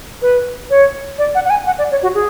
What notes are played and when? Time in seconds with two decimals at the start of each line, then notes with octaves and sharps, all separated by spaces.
0.22 B4
0.70 C#5
1.18 D5
1.35 F#5
1.45 F#5
1.50 G#5
1.66 F#5
1.78 D5
1.91 C#5
2.03 F#4
2.15 G#4